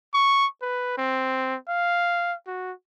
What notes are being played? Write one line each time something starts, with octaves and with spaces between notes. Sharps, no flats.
C#6
B4
C4
F5
F#4